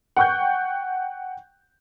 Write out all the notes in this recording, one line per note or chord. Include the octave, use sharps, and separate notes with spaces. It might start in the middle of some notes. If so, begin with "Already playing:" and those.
F#5 G5 C#6 F#6 G6